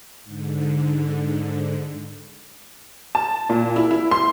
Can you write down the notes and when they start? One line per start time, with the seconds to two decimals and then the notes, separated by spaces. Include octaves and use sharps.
0.24 G#2 D3
3.15 A5
3.49 A#2
3.76 E4
3.91 E4
4.11 C6